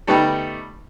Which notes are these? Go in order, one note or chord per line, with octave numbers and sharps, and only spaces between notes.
G3 A3 B3 D#4 G4